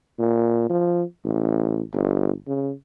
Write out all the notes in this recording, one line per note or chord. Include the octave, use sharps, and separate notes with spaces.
A#2
F3
A1
G1
C#3